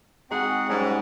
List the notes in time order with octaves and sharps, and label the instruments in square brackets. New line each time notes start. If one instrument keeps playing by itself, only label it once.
[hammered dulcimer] G#3 D#4 F#4 [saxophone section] C4 G#4 F#5
[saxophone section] G#2 [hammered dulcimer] F#3 G3 C#4